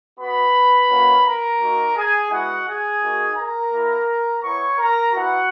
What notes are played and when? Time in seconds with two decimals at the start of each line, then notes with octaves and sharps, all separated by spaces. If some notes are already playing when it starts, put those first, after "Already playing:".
0.18 B3 F#4 B4 B5
0.89 A#3 C#4 F#4
1.24 A#4 A#5
1.59 A#3 D#4 F#4
1.95 G#4 G#5
2.30 G#3 B3 E4 F#4 F#5
2.66 G#4 G#5
3.02 A#3 D#4 F#4
3.36 A#4 A#5
3.72 A#3 E4
4.42 B3 E4 C#5 C#6
4.77 A#4 A#5
5.12 B3 E4 F#4 F#5